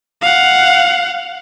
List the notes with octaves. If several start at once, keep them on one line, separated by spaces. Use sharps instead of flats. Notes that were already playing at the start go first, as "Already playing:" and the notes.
F5 F#5